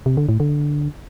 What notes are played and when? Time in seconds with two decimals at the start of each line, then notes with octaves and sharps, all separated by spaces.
0.06 C3
0.17 D3
0.29 A2
0.40 D3